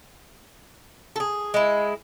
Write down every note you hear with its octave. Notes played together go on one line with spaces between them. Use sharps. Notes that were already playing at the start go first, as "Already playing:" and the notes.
G#4 A4
G#3 E4